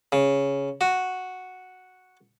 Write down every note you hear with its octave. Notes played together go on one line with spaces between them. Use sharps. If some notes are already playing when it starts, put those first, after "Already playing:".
C#3
F#4